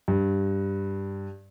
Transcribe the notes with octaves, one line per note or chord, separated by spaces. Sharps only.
G2